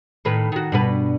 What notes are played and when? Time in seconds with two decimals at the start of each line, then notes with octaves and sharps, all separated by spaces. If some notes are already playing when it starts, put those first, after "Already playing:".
0.25 A2 D#3 B4
0.52 D#3 F#4
0.72 G2 B2 B4